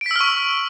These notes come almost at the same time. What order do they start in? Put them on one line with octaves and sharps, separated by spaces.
D7 B6 E6 F6 C#6